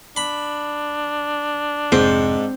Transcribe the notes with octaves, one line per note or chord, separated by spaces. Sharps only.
D4 B5
F1 G#2 C4